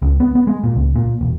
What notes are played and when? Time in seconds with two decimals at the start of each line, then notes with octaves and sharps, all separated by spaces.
0.02 C#2
0.20 B3
0.35 B3
0.47 G#3
0.64 A#2
0.76 C#2
0.96 A#2
1.21 E1